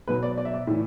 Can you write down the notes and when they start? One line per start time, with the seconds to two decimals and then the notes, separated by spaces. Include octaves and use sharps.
0.08 B2 F#3 B4
0.23 D5
0.38 D5
0.45 E5
0.54 D5
0.67 A2 E3